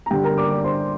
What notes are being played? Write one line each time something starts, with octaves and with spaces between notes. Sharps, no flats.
A#5
G2 D3 G4 G5
A#4 A#5
D5 D6
D5 D6
C5 C6